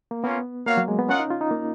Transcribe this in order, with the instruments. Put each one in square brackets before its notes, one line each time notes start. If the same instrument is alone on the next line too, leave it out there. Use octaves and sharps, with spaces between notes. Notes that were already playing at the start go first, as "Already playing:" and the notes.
[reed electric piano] A#3
[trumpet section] A#3 C#4 F4 [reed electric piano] B3
[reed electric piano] A#3 [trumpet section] F#4 C#5 F5
[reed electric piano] F#3
G#3
B3
[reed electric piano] C#4 [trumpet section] F4 A#4 D#5 F#5
[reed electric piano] D#4
F4
D#4
A#3